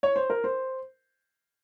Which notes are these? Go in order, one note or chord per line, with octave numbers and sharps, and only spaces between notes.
C#5
C5
A#4
C5